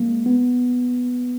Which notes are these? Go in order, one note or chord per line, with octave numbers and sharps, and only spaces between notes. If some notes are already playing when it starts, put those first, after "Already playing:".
Already playing: G#3 A#3
B3